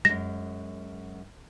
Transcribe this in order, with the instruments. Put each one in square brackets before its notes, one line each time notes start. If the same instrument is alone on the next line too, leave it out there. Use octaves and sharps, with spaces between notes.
[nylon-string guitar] F#2 G#3 [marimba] A#6